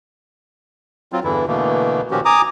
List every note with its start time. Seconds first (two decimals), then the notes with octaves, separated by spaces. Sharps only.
1.12 F#3 C4 F4
1.24 E2 G2 D3 E3 E4
1.47 B2 D3 E3 A3 A#3
2.11 A#2 D#3 F3 C#4 F#4 G4
2.25 G#5 A#5 D6 D#6